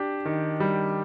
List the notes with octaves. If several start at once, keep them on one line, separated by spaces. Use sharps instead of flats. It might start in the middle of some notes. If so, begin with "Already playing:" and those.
Already playing: D4 G4
D#3
G3